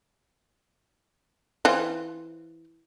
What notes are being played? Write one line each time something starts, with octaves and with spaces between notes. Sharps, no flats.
E3 C4 F4